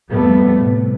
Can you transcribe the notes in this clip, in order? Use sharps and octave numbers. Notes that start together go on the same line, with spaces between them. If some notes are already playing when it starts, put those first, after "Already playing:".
F2 F3 G3 A3 B3
A2 C3